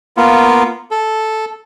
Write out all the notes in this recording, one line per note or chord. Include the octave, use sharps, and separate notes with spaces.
A#3 B3 F4
A4